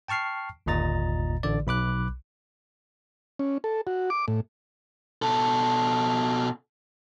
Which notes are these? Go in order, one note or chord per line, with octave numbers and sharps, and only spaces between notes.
G5 A5 C#6 F6 C7
G1 D#2 A#2 D#5 A#5 A6
A1 D3 D5
B1 B5 D6 F#6
C#4
A4
F#4
D6
A2
B2 A4